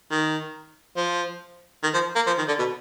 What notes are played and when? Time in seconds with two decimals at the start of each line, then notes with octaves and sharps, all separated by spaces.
0.11 D#3
0.96 F3
1.83 D#3
1.93 F3
2.15 A#3
2.27 F3
2.38 D#3
2.48 D3
2.58 B2